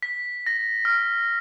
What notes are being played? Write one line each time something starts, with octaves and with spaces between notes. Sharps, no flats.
B6
A#6
F6